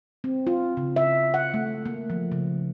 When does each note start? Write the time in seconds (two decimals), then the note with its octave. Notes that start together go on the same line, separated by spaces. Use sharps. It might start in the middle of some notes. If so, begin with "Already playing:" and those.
0.24 C4
0.47 F4
0.77 C#3
0.96 E5
1.34 F#5
1.54 A3
1.86 A#3
2.10 F3
2.32 C#3